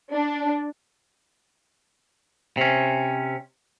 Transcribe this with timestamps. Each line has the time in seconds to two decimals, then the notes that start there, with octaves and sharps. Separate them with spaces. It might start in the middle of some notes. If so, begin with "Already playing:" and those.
0.14 D4
2.57 C3 C#4